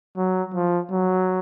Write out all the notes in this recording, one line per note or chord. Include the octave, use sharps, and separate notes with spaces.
F#3
F3
F#3